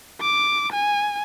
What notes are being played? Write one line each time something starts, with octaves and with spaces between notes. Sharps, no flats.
D6
G#5